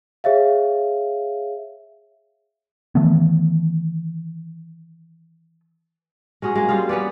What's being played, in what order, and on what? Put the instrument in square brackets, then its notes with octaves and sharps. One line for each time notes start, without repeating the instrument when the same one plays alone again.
[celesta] G#4 C#5 E5 F5
[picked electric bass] D#3 E3 A3 B3
[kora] G#3 C#4 F#4 G#4
G#3 A#3
G3 F4 G#4 F5
B3 C#4 B4 D5